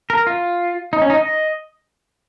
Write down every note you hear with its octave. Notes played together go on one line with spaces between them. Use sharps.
A#4
F4
D#4
C#4
D#4
D#5